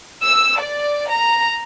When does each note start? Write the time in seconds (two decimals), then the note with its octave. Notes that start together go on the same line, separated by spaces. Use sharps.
0.25 E6
0.60 D5
1.10 A#5